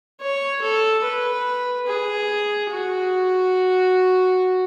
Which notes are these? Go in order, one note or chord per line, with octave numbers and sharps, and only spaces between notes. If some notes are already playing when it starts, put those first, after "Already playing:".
C#5
A4
B4
G#4
F#4